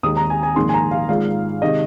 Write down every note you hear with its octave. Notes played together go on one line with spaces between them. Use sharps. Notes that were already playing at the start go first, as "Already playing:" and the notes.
D#2 D#3 G#3 D#4 D#6
A#5
G#5
G#5
A#1 G#2 D#3 A#3 C6
G#5
A#5
F5
G#1 G#2 G#3 F4 F5
C3 D#3 G#3 D#5